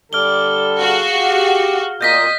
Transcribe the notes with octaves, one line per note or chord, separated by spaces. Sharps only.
D3 G3 A4 D5 F6 G7
F#4 G#4 F5
G4
A#2 D#5 D#6 G6 A#6 B6